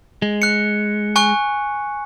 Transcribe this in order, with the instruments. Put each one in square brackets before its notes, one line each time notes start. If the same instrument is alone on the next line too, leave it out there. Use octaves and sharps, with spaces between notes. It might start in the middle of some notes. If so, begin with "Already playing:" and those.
[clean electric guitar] G#3
[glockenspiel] F#6 C#7
G#5 C#6 F#6